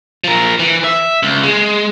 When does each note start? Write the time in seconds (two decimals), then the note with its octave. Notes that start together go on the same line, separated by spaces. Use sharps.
0.24 F3 A#4
0.60 E3
0.84 E5
1.23 C#2
1.44 G#3